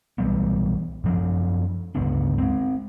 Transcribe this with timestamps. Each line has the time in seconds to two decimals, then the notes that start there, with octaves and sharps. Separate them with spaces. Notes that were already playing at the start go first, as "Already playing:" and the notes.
0.18 B1 E3 G3 B3
1.04 F#2 F3 D4
1.95 G1 C#2 B3 D4
2.38 G#3 C4